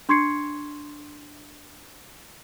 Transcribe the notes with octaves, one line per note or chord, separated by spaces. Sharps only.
D4 C6 C#6 G#6 C7 C#7